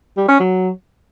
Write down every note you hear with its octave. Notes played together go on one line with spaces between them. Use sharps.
G3
C#4
F#3